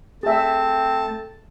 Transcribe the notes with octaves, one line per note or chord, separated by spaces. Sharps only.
A3 C4 G#4 E5 A5